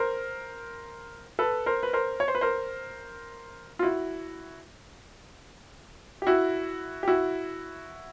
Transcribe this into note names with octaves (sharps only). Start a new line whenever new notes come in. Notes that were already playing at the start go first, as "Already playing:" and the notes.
Already playing: A#4 C5
A4 B4
A#4 C5
B4
A#4 C5
C#5
C5
B4
A#4 C5
F4
E4 F#4
G4
E4 F#4
G4
E4 F#4